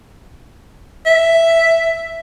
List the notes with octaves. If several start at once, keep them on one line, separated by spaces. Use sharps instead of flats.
E5